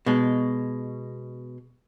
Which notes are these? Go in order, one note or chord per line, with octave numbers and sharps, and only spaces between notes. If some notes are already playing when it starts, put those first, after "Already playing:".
B2 G#3